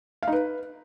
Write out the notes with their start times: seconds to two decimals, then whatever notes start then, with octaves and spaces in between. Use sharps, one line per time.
0.23 F5
0.28 D#4
0.33 B4